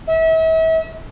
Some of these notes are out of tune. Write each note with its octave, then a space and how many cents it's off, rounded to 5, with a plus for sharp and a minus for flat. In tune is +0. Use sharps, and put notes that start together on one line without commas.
E5 -40